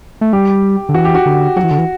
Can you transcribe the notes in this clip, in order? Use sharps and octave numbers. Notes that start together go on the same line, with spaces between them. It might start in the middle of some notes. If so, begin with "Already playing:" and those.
A3
G3 G4
D3
E3 F#4
G4
F#4
D3
F#3 F#4
E3
D3
E3